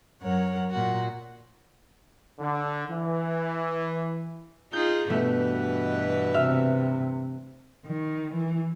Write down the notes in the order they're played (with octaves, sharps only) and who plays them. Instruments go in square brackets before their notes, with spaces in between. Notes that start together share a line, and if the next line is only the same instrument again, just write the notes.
[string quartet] F#2 F#3 A#4 C#5 F#5
A#2 F#4
[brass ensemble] D3
E3
[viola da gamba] D#4 F4 G#4 [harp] G6
[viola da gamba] G2 E3 B4 [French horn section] B2 [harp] A3
[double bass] C3 [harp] E5 F6
[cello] D#3
E3